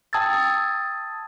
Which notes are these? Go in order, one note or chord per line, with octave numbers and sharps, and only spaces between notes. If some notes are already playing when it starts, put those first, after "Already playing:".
G5 A5 D#6 E6 G#6 A6